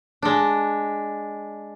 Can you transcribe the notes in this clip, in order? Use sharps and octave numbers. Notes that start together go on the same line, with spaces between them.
G#3 D4